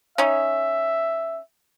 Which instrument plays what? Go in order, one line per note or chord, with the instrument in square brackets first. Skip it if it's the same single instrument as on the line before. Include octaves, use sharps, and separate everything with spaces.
[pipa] C#4 D#4 [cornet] E5